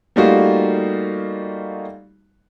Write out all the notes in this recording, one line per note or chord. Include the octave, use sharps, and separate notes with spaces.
G3 A3 A#3 D#4 F4 F#4